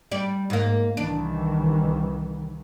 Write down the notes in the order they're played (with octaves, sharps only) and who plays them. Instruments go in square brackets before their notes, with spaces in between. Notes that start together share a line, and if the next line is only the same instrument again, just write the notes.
[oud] G3 D5
G#2 A#3
[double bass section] C2 D#3 E3 [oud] D4